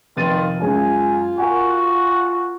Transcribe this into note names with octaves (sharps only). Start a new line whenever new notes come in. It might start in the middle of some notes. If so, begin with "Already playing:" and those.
F1 D#3 F4 A6 D#7
F#2 G#3 F4 G#5
F#4 A#4 F#5 G#5